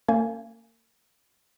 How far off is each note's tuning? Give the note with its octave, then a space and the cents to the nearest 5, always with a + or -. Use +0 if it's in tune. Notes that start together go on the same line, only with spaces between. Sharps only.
A#3 -35 C#4 +0 G#5 +0